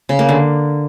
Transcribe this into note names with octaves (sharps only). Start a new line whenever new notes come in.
C#3
A#3
D3